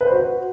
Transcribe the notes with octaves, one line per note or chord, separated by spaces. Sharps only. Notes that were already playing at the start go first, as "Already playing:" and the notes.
B4
C5
F#4